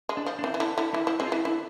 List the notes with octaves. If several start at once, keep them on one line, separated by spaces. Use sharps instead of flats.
G#3
D4
F3
D4
E3 C4
E3
D3 E4
D3 E4
E3 E4
F3 E4
G#3 C4
F4
E3 E4
D3 E4